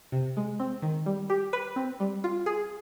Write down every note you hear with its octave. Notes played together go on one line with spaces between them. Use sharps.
C3
G#3
C4
D#3
G3
G4
B4
C4
G3
F4
G#4